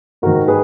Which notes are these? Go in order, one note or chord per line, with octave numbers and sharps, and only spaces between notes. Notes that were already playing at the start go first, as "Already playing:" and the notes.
G#2 D#3 F#4 A#4
G#4 B4